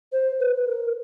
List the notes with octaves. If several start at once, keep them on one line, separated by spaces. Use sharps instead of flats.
C5
B4
B4
A#4